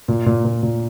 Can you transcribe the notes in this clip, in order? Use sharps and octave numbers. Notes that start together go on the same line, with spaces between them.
A#2
A#2
A#2
A#2